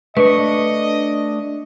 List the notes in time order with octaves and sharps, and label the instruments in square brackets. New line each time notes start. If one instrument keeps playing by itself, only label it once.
[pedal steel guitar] A3 D4 C#6 [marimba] B4 [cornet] D#5